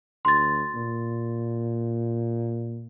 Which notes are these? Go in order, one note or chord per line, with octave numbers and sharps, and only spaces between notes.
D2 C6 A6
A#2